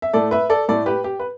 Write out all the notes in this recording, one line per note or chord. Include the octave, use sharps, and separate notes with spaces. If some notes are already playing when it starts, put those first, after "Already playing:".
E5
A2 A3 A4 D5
B4 E5
A4 D5
A2 A3 A4 D5
G4 B4
G4
B4